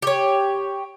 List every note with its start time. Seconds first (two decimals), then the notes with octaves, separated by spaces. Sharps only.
0.02 G4 C#5